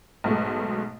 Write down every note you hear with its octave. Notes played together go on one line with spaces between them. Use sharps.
B1 G#2 B2 A3